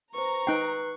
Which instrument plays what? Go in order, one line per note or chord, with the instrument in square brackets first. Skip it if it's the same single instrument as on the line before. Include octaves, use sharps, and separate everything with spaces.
[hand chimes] B4 C5 [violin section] A#5 [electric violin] C#6
[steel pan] D#4 G5 [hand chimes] B4 F#6 C7